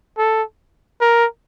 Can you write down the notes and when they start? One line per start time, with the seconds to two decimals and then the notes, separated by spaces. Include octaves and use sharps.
0.18 A4
1.01 A#4